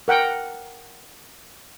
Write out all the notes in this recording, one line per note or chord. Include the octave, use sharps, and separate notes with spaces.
A#4 F#5 G5